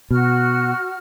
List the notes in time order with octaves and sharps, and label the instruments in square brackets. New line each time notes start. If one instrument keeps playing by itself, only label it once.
[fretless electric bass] B2 [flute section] F#4 F6